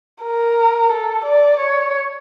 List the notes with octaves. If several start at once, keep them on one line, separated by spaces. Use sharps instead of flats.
A#4
A4
D5
C#5